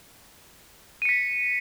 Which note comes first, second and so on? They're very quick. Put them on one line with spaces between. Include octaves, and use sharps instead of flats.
D#7 C#7 B6